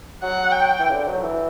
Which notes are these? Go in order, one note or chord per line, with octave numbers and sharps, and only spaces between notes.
F#3 F#5
G5
E3
C#3
D3
F#3
E3